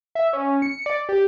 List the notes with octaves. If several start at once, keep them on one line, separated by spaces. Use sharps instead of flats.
E5
C#4
C#7
D5
G4